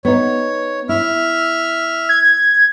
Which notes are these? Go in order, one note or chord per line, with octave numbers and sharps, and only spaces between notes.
B3 D#4 C#5
E4 E5 F6
G#6